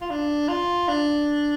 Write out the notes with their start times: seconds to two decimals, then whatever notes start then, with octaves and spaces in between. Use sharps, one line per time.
0.01 F4
0.10 D4
0.48 F4
0.88 D4